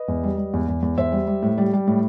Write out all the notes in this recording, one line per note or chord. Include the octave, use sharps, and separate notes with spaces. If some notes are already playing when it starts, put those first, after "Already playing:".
Already playing: B4 D#5
E2
G3
G3
E2
E2
E2
E2 C5 E5
G3
G3
A2
G3
G3
A2